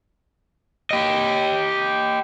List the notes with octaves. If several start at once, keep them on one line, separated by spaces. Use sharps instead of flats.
G4 D#5